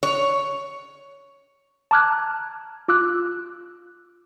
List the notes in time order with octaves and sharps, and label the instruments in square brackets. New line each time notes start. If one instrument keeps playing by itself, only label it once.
[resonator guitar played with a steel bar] C#5
[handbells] A5 A#5 D6 F6 F#6 G#6
F4 D6 E6 F#6